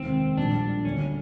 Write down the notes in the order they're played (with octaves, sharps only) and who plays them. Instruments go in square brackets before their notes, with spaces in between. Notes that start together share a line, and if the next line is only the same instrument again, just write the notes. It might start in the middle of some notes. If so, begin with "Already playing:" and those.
Already playing: [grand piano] F1 D#2 D#3 G#3 [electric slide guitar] C4
[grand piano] A#1 A#2 G3 [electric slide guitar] D4
[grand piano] D2 D3 F#3 [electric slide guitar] C#4